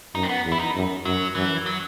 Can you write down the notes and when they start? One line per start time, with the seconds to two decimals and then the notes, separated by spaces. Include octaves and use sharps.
0.14 F#2 D#4
0.23 C4
0.29 B3
0.44 E2
0.52 E4
0.60 D#4
0.75 F#2
1.05 F#2 F#3
1.35 F#2 E3
1.66 F#3